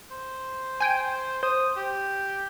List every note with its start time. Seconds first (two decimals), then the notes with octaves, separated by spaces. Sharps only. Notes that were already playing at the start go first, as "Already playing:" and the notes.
0.11 C5
0.81 G5 G#5
1.43 C5 D#6
1.76 G4